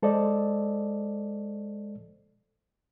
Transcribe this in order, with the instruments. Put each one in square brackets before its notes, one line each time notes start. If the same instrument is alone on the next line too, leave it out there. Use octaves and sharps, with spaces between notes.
[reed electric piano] G#3 A4 C5 D5 D#5